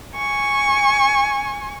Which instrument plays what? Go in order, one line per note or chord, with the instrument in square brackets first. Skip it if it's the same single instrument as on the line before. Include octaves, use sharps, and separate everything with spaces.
[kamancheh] G#5 C#6